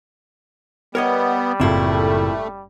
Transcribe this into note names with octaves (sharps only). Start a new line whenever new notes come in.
G3 B3 A#4 C#5 D#5
F#1 A2 A3 C4 E4 F4 A4